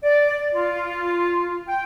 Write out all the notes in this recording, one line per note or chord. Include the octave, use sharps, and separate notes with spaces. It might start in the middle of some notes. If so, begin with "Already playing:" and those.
D5
F4
G5